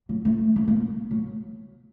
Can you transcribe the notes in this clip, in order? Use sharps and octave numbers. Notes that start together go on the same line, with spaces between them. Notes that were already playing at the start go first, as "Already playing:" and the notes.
F#3
A3
A3
A#3
F#3